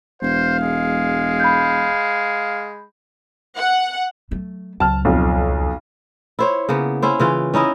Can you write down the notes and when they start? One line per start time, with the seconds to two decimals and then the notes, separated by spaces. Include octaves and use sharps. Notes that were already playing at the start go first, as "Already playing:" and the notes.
0.22 E1 C5 F5
0.59 G#3
1.40 B5 G6
3.56 F#5
4.31 F#3 A3
4.80 C#2 F#3 A5 F6
5.05 B1 F2
6.39 E4 C5 C#5
6.69 C#3 A#3 B3
7.02 C#4 E4 C5
7.20 C#3 E3 F4
7.54 C#4 D#4 E4 D#5